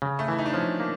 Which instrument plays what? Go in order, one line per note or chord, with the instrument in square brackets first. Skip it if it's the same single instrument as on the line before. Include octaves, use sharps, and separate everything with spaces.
[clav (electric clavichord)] C#3
[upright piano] A3
[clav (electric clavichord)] E3 [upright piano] E4
[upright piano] D#4
D4
[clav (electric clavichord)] F3 [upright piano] C#4
[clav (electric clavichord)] A#3